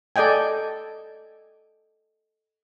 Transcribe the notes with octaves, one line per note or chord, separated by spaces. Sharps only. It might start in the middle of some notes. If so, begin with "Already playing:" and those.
A4 D5 D#5 G5 G#5